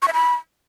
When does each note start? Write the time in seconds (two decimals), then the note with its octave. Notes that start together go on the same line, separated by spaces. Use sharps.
0.02 C#6
0.08 E5
0.13 B5